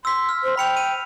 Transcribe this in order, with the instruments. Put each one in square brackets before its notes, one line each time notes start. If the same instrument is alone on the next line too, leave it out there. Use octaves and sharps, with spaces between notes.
[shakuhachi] C6 [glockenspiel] E6 B6
[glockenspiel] F6
[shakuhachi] C5
[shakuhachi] G5 [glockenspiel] B5 C#7 F7
[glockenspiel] D#7